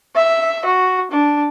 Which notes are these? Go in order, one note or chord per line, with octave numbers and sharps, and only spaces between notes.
E5
F#4
D4